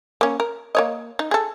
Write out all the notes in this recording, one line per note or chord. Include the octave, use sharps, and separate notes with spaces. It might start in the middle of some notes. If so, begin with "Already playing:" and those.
A#3 C#4
A#4
A#3 C#5 D#5
D#4
G#4 A4